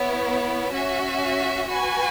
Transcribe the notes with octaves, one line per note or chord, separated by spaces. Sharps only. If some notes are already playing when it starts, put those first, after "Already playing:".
Already playing: B3 E4 C#5
C#4 F#4 E5
F#4 B4 G#5